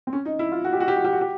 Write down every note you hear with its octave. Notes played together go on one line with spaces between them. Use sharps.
C4
C#4
D#4
E4
F4
F#4
G4
F#4
G4
F#4
G4
F#4
G4